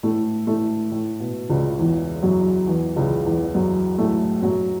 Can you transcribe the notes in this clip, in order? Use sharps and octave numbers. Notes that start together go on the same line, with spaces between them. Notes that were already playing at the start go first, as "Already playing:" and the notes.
A2 A3
A2 A3
A2
B2
C#2 C#3
E2 E3
F#2 F#3
E2 E3
C#2 C#3
E2 E3
F#2 F#3
A2 A3
F#2 F#3